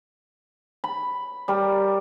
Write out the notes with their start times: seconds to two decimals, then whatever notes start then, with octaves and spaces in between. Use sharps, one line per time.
0.84 B5
1.48 G3 A#4